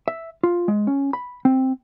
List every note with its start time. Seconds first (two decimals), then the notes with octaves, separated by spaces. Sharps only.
0.08 E5
0.43 F4
0.68 G#3
0.87 C#4
1.13 B5
1.45 C4